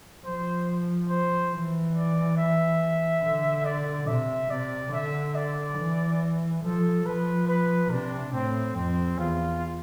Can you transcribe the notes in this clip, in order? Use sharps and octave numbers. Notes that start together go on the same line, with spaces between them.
F3 C5
C5
E3
D5
E5
D3
D5
C3 E5
C3 D5
D3 E5
D5
E3
F3 A4
F3 B4
B4
C3 D4
A2 C4
F2 C4
E2 F4